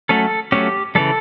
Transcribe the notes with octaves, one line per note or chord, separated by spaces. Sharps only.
F#3 A3 C#4 A4
F#3 A3 C#4 G4
C#3 E3 G3 A4